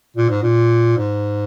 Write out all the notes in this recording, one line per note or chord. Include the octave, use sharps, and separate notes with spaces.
A#2
G#2
A#2
G#2